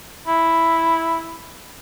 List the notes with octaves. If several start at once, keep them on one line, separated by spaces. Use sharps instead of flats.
E4